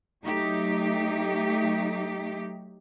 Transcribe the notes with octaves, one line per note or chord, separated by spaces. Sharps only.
F#3 A3 D#4 G4